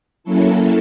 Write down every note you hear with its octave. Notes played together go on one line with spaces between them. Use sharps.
F#3 A#3 C#4 E4 A4